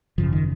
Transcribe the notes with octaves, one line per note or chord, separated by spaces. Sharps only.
G#1 F#2 C#3 F3
D#3